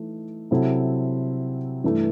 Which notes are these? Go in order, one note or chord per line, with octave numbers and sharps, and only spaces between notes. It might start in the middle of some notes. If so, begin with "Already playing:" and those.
Already playing: E3 A3 D#4
C3 F#3 C4 E4 A4
G2 E3 A3 E4